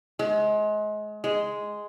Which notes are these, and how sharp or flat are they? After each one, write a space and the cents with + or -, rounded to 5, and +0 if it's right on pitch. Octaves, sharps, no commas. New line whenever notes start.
G#3 +30
G#3 +0